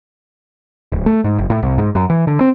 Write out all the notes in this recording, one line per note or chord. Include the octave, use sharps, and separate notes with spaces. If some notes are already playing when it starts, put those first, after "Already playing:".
D1
A3
G#2
F#1
A2
C2
G#2
F#2
E3
D3
C4